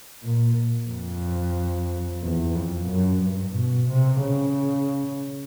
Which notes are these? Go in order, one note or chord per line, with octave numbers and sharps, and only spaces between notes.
A#2
F2
E2
F2
F#2
G2
B2
C3
C#3